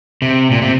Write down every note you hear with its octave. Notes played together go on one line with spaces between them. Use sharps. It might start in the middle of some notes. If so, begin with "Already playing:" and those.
C3
A#2
C3